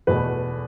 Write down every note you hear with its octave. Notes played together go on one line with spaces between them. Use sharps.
E2 B2 A3 B4